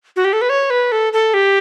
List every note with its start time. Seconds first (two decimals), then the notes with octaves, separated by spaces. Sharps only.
0.16 F#4
0.25 G4
0.33 A4
0.41 B4
0.49 C#5
0.70 B4
0.92 A4
1.13 A4
1.34 G4